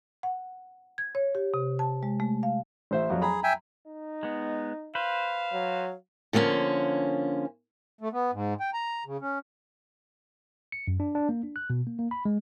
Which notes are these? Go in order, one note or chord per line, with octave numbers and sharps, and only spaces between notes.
F#5
G#6
C#5
G4
C3
A5
G#3
A3
F5
A1 C5 E5
F2 F#3
G#4 A#5 B5
E5 G5 G#5
D#4
G#3 B3
B4 C5 F5
F#3
D3 F3 A#3 C4 C#4
A3
B3
G#2
G5
A#5
C#3
C#4
C#7
F#2
D4
D4
A#3
D4
F#6
B2
A#3
A#3
B5
G#3